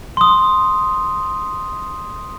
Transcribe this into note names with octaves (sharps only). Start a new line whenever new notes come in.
C6 D#6